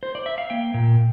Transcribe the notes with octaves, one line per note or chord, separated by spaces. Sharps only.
C5
D5
E5
F5
A#3 G5
A#2